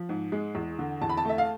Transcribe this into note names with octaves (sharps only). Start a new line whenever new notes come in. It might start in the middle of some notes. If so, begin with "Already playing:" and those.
Already playing: F3
G#2
G#3
E2
D3
E2 A5
B5
A5
A3 E5
F5